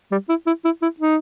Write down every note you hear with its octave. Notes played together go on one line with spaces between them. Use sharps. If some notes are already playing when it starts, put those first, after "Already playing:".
G3
E4
E4
E4
E4
D#4